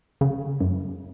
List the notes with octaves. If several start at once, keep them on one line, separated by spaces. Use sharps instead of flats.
C#3
F#2